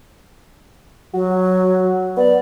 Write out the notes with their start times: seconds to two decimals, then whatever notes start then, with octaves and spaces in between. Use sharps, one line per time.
1.14 F#3 F#4
2.17 B3 D5